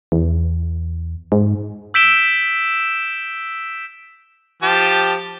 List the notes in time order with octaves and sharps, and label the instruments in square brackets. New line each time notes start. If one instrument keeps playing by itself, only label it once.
[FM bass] E2
G#2
[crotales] E6 G6 B6 D7 E7 G7
[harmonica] F3 G4 A5